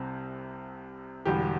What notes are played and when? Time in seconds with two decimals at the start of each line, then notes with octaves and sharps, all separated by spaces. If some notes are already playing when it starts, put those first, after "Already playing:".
Already playing: C2 C3 C4
1.25 E1 E2 D3 G3 G4